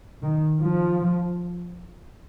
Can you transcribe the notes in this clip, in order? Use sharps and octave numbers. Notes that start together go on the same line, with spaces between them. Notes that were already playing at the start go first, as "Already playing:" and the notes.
D#3
F3